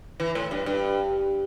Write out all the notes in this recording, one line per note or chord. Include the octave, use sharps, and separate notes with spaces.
E3
A2
G2
G2